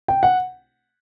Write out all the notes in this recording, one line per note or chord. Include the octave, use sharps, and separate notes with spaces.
G5
F#5